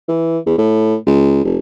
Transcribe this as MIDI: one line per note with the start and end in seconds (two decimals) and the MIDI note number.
0.08 0.38 52
0.46 0.53 40
0.58 0.96 45
1.07 1.42 37
1.44 1.58 29